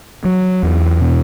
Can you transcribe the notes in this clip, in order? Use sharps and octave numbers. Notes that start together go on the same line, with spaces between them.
F#3
E2
B2